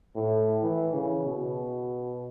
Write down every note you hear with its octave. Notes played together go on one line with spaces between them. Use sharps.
A2
E3
C#3
B2